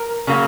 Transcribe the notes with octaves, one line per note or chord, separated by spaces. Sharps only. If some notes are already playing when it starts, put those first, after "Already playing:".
Already playing: A#4
C#3 F#3 A#3